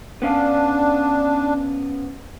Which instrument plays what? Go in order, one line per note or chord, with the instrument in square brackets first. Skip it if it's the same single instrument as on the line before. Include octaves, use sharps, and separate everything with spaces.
[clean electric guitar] B3 C#4 F5 [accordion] D4